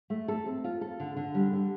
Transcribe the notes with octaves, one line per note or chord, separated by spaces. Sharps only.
A3
A4
C4
F4
A4
D3
D3
G3
D3